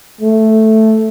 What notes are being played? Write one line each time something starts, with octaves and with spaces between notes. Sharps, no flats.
A3